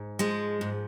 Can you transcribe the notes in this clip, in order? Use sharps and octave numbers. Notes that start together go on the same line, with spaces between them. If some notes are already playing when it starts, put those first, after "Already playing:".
Already playing: G#2
F3 G#3
G#2